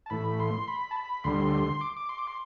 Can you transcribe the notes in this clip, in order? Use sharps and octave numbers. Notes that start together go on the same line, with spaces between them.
A5
A2 E3 A3 B5
C6
B5
A5
B5
D2 D3 G3 C6
D6
D6
C6
D6
C6